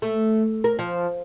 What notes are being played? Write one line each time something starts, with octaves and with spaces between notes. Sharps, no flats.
A3
A#4
F3